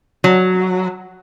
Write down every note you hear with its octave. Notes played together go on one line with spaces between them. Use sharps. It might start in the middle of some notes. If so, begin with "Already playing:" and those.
F#3